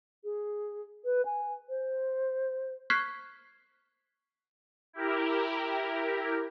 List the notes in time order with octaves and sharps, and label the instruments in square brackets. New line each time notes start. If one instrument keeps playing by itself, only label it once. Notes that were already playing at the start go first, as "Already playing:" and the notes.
[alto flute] G#4
B4
G#5
C5
[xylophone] C#6 F6 F#6 G#6 B6 C7
[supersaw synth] E4 G4 A#4